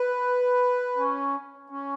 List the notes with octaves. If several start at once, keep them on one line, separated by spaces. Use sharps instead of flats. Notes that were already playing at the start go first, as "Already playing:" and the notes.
Already playing: B4
C#4
C#4